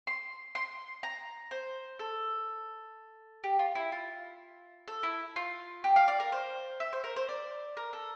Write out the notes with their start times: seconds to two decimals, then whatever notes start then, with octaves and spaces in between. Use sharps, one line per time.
0.07 C6
0.55 C6
1.03 A#5
1.51 C5
1.99 A4
3.44 G4
3.59 F4
3.75 E4
3.92 F4
4.88 A4
5.03 E4
5.36 F4
5.84 G4
5.96 F5
6.08 D5
6.20 A#4
6.32 C5
6.80 E5
6.93 C5
7.04 A#4
7.16 C5
7.29 D5
7.77 A#4
7.93 A4